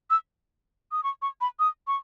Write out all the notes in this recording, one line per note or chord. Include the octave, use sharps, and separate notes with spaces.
E6
D#6
C#6
C#6
B5
D#6
C#6